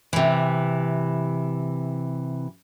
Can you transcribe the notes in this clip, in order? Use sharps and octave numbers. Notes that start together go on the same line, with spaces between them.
C3 E3